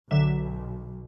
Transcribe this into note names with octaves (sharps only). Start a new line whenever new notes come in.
B1 D3 F#3 E5